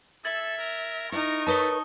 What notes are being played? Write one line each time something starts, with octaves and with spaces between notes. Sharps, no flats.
A4 E5 G#6 A6 F#7
A#4
D#4 E4 A#4 C#6
A3 A#4 B4 C#5 A5 D#6 G7